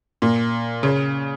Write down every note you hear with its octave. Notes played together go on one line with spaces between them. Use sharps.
A#2
C#3